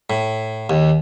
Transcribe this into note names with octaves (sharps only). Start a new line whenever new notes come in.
A2
D#2